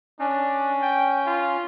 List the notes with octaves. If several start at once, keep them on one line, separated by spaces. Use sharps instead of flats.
C#4 D4
G5
F4